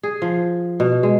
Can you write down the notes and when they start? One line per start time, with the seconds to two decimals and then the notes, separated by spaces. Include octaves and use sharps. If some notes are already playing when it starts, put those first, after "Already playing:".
0.03 G#4
0.22 F3
0.80 B2
1.03 G#3